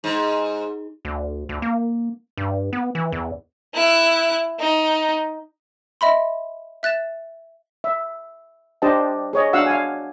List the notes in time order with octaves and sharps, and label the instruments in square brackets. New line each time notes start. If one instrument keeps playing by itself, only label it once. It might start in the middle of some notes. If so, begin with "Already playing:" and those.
[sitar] G#2
[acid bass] D2
D2
A#3
G2
B3
E3
E2
[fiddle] E4 F#6
D#4
[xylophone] D#5 E5 B5 C6
E5 F#6 A6 E7
[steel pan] E5
D4 G4 C5 D#5 G5 A5
G#4 C#5 D#5
D4 F#4 F5 F#5 E6
F5 G#5